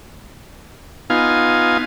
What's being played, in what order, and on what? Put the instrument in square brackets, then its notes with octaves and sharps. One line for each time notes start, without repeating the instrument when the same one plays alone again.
[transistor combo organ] B3 D#4 F4 F5 G#5